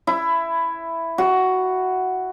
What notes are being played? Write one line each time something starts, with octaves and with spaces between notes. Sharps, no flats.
E4
F#4